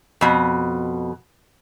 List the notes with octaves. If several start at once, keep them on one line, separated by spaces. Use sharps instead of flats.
F2 B2